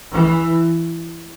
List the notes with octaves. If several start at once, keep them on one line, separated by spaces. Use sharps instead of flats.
E3